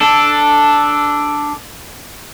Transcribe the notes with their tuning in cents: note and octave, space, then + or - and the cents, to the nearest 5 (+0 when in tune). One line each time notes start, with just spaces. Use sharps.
D4 +0 A4 +0